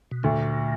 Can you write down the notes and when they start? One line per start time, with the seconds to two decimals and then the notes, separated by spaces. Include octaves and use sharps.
0.11 B2
0.23 D2 A#2